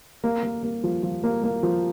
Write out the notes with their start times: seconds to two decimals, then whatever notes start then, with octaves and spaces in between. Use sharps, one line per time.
0.24 A#3
0.43 A#3
0.63 A#3
0.84 F3
1.03 F3
1.23 A#3
1.44 A#3
1.63 F3